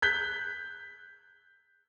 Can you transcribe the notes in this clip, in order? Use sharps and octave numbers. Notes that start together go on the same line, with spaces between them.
F#6 G6 B6 G7